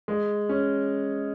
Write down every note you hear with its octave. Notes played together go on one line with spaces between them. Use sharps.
G#3
C#4